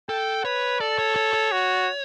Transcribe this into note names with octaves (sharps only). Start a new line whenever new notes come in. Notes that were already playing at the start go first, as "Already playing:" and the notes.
A4 G5
B4 C#5
A4 D5
C#5
C#5
C#5
F#4